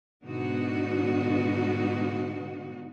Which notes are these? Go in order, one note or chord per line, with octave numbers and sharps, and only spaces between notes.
G#2 B2 D3 B3 D#4 F#4